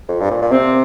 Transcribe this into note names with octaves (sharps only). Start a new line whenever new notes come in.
F2
G2
A#2
A#2
C3 C4